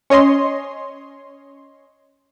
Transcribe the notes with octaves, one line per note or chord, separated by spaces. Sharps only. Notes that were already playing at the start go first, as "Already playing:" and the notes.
C#4 C#5 D#5 C6